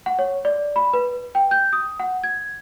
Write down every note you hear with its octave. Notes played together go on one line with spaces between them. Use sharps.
F#5
C#5
D5
B5
B4
G5
G6
D#6
F#5
G#6